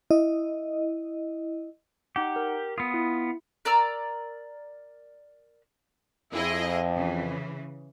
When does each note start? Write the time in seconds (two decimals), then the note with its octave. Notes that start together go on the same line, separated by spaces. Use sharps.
0.11 E4 D#5
2.16 D#4 G4 F#5
2.36 A#4
2.78 B3 F4 D#6
2.94 E4
3.65 A#4 D5 A#5 E6
6.33 F2 E4 G#4 D#5
6.94 C#3 E3